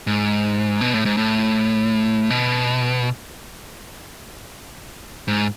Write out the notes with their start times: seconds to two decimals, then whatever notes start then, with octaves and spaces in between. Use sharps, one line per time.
0.07 G#2
0.81 B2
0.94 A2
1.05 G#2
1.17 A2
2.30 B2
5.28 G#2